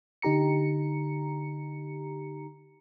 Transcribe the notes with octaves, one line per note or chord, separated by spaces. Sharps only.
D3 D#4 G4 A#5 C#7